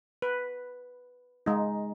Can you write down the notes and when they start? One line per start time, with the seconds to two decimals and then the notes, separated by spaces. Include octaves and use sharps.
0.22 B4
1.46 G#3 D#4